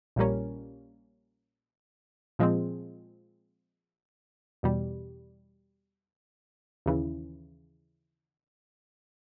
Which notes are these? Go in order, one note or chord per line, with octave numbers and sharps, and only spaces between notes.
A#1 A#2 G3 A#3 C#4
A#2 F3 G#3 C4
E2 B2 G3
D#2 C#3 E3